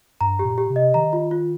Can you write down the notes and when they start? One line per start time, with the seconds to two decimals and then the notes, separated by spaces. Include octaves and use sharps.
0.21 G2 A#5
0.39 G4
0.45 A#2
0.58 G4
0.70 C3
0.76 D#5
0.94 D#3 A#5
1.13 F4
1.31 F4